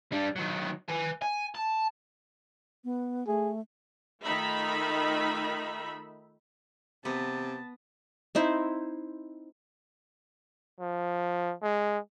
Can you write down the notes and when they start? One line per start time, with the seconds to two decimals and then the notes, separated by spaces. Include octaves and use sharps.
0.12 G3 D4
0.36 D#3 F#3
0.89 B4 G#5
1.22 G#5
1.55 A5
2.84 B3
3.27 A3 G#4
4.23 D#3 A3 D#4 F4 E5 B5
7.05 C3 B3 A5
8.35 C4 D#4 E4 C5
10.80 F3
11.62 G#3